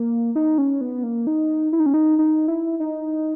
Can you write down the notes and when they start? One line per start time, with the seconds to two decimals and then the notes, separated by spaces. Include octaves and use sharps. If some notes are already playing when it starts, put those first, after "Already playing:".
Already playing: A#3
0.35 D#4
0.58 C#4
0.81 B3
1.03 A#3
1.27 D#4
1.73 E4
1.80 D#4
1.86 C#4
1.94 D#4
2.19 D#4
2.48 E4
2.80 D#4